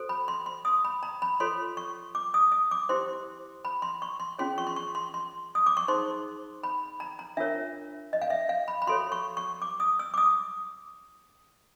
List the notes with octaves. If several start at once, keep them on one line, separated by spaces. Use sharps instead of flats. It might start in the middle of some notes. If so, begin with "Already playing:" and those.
Already playing: F#4 A4 C5
B5
C6
C6
D#6
B5
A#5
B5
F4 A4 C#5 C6
C#6
D6
D#6
D#6
D6
E4 G4 C5 C6
B5
C6
C#6
C6
C#4 F4 G#4 C#5 C6
C#6
C6
C#6
C6
C6
D#6
D6
C#6
D#4 G#4 C5 C6
B5
A#5
A#5
D4 F4 A#4 C#5 E5
D#5
F5
E5
F5
B5
B5
F#4 A4 C#5 C6
C#6
C#6
D6
D#6
E6
D6
D#6